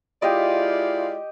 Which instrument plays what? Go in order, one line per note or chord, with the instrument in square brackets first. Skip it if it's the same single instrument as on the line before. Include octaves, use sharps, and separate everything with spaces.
[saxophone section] G#3 E4 F4 [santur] G4 D#5 [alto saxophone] D5